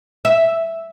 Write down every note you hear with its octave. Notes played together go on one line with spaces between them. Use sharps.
E5